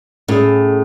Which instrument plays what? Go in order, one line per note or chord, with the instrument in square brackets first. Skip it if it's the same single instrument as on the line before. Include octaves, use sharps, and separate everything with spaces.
[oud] A2 [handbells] C#4 E4 G#4